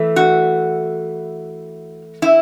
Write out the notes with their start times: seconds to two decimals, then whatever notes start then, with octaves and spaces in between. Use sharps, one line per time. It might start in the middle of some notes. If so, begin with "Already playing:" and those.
Already playing: E3 A3
0.16 F#4
2.22 E4